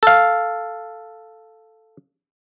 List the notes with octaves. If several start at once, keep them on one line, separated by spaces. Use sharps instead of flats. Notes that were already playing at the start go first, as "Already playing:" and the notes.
A4 F5